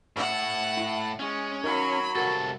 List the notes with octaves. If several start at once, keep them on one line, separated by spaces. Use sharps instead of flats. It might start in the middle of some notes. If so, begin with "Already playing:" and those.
A2 E5 F#5
E4
G#3 C#4
F#3 D#4 A#4 B5
C2 F#4 A4 A#4